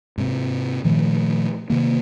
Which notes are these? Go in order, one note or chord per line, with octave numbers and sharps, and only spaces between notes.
G#2 C3
A#2 D#3 F3 A3
C3 D#3 A#3